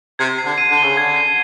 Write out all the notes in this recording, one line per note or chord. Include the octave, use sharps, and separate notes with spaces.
C3 G#6
C7
D3
D#7
D3
G7
C#3
D3 G#6
C7